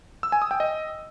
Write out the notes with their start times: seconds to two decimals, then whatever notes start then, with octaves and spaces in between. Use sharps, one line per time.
0.23 E6
0.32 G#5
0.42 D#6
0.51 G5
0.60 D#5